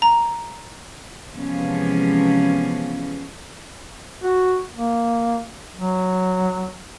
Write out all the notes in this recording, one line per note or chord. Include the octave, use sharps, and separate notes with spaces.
A#5
C3 E3 F3 G#3 B3 C#4
F#4
A#3
F#3